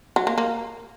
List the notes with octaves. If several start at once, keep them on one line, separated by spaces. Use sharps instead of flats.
F#3
A#3
A#3